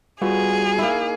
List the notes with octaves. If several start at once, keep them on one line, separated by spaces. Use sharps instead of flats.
G3 B3 F4 F#4 G#4
A#3 D#4 E4